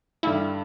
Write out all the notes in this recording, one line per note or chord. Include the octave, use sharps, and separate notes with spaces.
G2 D3 G3 E4